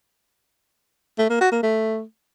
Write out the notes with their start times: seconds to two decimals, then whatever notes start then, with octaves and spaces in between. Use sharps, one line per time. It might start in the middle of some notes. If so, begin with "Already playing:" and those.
1.19 A3
1.30 A#3
1.41 F#4
1.52 A#3
1.63 A3